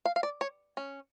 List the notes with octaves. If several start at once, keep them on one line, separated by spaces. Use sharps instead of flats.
F5
F5
D5
C#5
C#4